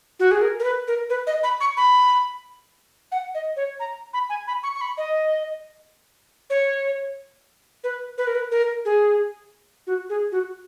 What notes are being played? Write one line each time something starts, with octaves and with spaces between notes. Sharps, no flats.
F#4
G#4
A#4
A#4
B4
A#4
B4
D#5
B5
C#6
B5
F#5
D#5
C#5
A#5
B5
G#5
B5
C#6
C#6
B5
D#5
C#5
B4
B4
A#4
B4
A#4
G#4
F#4
G#4
F#4